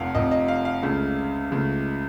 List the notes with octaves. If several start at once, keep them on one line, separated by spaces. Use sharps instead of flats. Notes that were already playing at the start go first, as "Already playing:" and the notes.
Already playing: F1 F2 C3 F5 F#5
F1 F2 C3 D#5
D#5
F5
F5
C#2 C#3 A3
C#2 C#3 A3